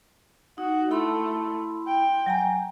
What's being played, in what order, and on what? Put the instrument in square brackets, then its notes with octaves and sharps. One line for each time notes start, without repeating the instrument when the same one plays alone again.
[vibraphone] D#4 [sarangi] F#4
[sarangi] A3 [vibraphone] E4 B5 C6
[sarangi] G5
[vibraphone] F#3 G#5 A#5